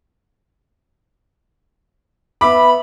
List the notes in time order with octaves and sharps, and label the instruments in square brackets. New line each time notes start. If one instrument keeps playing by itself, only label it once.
[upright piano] B3 E5 D6 [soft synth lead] B5